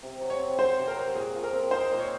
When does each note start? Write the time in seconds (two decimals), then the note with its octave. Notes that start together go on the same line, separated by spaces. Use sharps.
0.03 C3
0.21 F#3
0.30 C#5
0.39 C4
0.59 F#4 C5
0.77 C3
0.87 A#4
0.96 F#3
1.15 A#2 G#4
1.35 F3
1.44 A#4
1.53 C4
1.71 D#4 C5
1.91 A#2
2.00 C#5